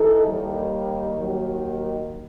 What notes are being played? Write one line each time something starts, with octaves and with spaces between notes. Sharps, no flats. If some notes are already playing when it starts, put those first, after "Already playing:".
Already playing: E3 D#4 A4
D#2 D#3 G3
D#2 D#3 F#3